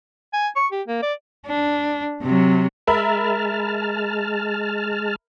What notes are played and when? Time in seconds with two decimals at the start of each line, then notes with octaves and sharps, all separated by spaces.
0.33 G#5
0.56 C#6
0.72 G4
0.88 A#3
1.03 D5
1.46 D4
2.22 C3 F#3
2.87 G#3 A#4 E5 A5 B5 F6